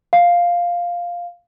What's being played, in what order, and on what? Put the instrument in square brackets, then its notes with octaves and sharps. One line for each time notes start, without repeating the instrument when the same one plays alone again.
[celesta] F5